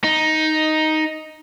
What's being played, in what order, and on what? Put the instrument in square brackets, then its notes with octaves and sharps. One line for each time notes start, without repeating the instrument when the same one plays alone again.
[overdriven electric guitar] D#4